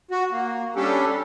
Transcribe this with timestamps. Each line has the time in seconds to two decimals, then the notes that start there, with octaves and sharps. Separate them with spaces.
0.11 F#4
0.32 A#3
0.76 G3 C#4 D4 G4 A4